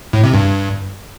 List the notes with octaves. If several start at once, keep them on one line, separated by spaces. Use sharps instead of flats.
A2
C3
G2